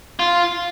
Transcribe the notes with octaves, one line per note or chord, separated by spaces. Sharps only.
F4